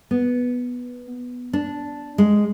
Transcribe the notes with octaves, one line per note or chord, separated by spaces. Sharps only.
B3
D4
G#3